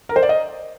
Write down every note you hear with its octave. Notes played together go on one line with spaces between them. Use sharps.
A#4
C5
D5
D#5